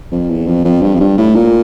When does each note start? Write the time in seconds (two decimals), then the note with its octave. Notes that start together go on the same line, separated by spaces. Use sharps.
0.12 F2
0.29 E2
0.47 F2
0.65 F2
0.82 G2
0.95 F2
1.00 G2
1.18 A2
1.35 A#2